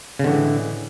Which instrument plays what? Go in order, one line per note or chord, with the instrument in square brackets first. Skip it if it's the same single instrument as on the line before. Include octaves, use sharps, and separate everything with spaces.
[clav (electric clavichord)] C#3
[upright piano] A2 E3 G#3 C#4 [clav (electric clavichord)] D3